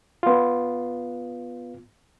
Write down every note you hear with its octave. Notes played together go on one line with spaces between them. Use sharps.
B3 F4